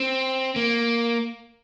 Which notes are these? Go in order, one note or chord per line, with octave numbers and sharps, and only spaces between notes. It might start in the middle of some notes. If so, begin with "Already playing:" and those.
Already playing: C4
A#3